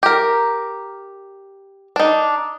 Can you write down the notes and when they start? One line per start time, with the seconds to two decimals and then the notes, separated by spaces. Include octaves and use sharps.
0.03 G4 A#4
1.96 D4 D#4